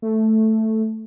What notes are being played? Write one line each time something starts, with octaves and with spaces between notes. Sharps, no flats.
A3